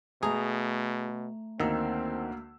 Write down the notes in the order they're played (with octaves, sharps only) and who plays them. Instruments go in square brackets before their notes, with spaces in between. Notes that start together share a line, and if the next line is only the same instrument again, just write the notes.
[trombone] B2 [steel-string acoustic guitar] A3 A#5 [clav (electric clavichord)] G#4
[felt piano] D2 A#3 E6 [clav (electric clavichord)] D#3 [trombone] C4